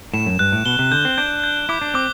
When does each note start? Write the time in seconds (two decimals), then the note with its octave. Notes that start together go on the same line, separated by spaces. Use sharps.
0.13 A2 E7
0.26 F#2
0.39 G2 F#6
0.53 A2
0.66 B2 G7
0.79 C3
0.92 D3 G6
1.05 C4
1.18 D4 G6
1.44 G6
1.69 E4 D6
1.81 D4
1.94 C4 D6